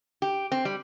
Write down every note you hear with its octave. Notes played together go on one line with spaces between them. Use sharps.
G4
C4
G3